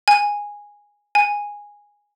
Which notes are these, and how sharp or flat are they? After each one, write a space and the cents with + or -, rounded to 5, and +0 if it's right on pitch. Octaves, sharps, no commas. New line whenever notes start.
G#5 -10
G#5 -10